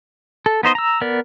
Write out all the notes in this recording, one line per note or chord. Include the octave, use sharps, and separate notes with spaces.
A4
B3 D#4 C5 D#5
A#5 E6
B3 A#4 D5